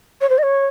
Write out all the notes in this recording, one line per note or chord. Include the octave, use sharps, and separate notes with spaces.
C#5
C5
D#5
C#5